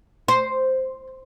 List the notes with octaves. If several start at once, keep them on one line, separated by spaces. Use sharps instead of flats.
C5